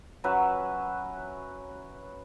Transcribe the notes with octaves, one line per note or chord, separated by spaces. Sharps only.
F#3 C#4 B4 E5